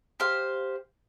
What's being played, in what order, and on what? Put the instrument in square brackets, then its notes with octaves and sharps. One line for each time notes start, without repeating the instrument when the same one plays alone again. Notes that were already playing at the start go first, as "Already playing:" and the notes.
[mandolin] G4 C5 F5